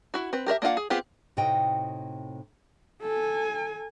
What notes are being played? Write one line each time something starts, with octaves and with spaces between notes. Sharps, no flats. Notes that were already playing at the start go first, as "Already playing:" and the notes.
E4 F#4
C4 B4
G4 A#4 C5 E5
A#3 D4 F4 F5 F#5
G#4
B3 C4 F4 G4 G#4
A2 C3 D#4 F#4 D#5 G5
A4 G#5